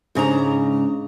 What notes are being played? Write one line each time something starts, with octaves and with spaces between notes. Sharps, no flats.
G#2 C#3 D4 A#5